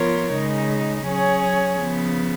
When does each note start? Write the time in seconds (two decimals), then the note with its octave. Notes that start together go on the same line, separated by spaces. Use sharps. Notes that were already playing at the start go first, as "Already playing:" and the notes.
Already playing: F3 B3 F4 A#4 C#5
0.33 C#3 G#3 D#4
1.06 F#3 C#4 G#4 C#5
1.80 C#3 F3 B3